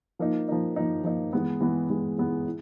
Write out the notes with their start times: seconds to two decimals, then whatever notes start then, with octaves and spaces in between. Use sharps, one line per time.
0.19 F3 A#3 D#4
0.48 F3 A#3 D#4
0.76 F3 A#3 D#4
1.04 F3 A#3 D#4
1.33 E3 G#3 B3
1.60 E3 G#3 B3
1.89 E3 G#3 B3
2.18 E3 G#3 B3
2.46 E4